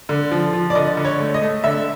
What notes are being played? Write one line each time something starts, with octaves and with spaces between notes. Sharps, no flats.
D3
F3
F3
D5
D3 D#5
D3
C#5
A3
D#5
A3
D3 E5